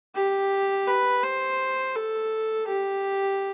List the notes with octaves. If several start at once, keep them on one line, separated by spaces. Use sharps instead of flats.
G4
B4
C5
A4
G4